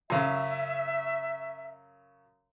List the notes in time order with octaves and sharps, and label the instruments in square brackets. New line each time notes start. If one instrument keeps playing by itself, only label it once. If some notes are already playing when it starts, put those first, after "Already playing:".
[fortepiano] F#2 C#3 [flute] E5